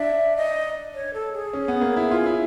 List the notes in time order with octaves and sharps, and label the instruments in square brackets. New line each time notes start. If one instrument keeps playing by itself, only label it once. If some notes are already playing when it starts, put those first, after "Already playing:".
Already playing: [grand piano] D4 [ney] E5
[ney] D#5
C#5
A4
G#4
[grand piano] C#4
B3
A#3
E4
F4
E4